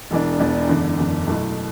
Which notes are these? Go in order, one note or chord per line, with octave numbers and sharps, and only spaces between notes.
E1 E2 E3 D4
E1 E2 E3 D4
F#1 E2 D3
F#1 E2 D3
B1 B2 A3 E4